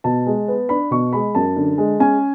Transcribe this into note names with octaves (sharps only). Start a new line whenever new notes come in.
B2 A5
G#3
B3
D4 B5
B2 C#6
G#3 B5
F#2 A5
D3
G#3
C#4 G#5